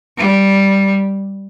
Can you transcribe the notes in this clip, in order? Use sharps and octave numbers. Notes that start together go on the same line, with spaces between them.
G3